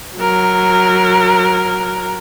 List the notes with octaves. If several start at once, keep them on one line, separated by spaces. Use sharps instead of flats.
F#3 A#4